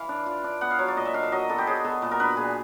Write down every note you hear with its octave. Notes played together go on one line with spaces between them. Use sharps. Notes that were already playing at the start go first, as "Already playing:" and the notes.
Already playing: E3 F5
D4
F4
D4
B3 F#5
F5
F#3 C#5
D5
A#2 D#5
E5
D4 F5
E5
F#3 D#5
B3 A4
G4
F#3 G#4
B3 A4
A#2
A#4
D4 B4
A#2 G#4